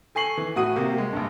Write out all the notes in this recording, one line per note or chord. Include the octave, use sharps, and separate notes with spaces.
A4 G#5 C#6 C7 F#7
E3
A2 F#4 D#6 D#7
C3 A#3 G4
G#3
A#1 G2